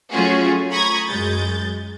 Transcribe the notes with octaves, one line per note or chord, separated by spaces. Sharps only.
F#3 A3 C#4 F4 F#4 G#4
A#5 B5 C#6 D#6 G#6 A#6
F#2 G#3 G6 A6